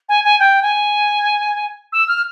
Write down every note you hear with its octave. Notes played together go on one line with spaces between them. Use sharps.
G#5
G#5
G5
G#5
E6
F6